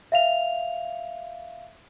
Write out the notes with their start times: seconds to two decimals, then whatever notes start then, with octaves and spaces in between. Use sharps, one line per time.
0.12 E5 F5 F7